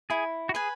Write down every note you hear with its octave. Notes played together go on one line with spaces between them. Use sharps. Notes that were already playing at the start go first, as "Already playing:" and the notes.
E4 G#4
F#4
G#4 B4 G#5